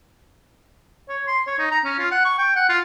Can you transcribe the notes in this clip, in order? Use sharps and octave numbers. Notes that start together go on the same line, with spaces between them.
C#5
C6
C#5
D#4
A#5
C#4
F4
F#5
C#6
G5
F#5
F4